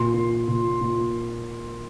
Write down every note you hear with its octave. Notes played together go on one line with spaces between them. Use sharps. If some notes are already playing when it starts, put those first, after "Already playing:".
Already playing: A#2 C6
A#2
A#2
A#2